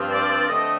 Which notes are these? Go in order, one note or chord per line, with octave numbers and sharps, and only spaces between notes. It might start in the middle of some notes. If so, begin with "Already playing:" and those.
Already playing: G2 F3 C4
D5
D3 A3 C4 D#5